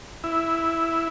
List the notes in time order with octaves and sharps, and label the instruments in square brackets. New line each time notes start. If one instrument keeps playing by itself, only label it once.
[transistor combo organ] E4